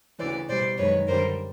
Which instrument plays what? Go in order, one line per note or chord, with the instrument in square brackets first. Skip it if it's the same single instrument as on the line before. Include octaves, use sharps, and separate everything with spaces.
[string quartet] D2 C#3 E3 C5 D5
B2 G3 C5 D5
F#2 D#3 G#3 B4 C#5
F#2 D3 G3 A#4 C5